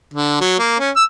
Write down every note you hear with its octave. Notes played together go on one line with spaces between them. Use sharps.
D3
F#3
A#3
C#4
E6